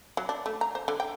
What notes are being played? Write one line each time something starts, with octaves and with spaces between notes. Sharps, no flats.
F#3
D4
A3
A#5
C5
D3
G5